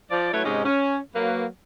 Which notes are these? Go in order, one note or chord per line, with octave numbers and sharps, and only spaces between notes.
F3 D5
F#3 A3 E4 B4 C#5
G#2 C3 G#3 C#4 D#4 G4
C#4
F#3 A#3 B4